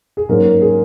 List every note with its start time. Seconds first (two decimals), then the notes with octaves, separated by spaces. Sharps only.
0.17 G#4
0.29 G#2 F#3 A#3 C#4 A#4
0.61 G#4